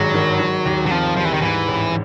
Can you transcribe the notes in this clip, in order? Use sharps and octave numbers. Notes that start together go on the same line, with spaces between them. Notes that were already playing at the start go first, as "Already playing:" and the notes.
Already playing: G#1 G2 F#3 G#3
D#3
D#3
D#2
F#3
F3 C4
F3 G3
E3
D#3
G#2 E3
A1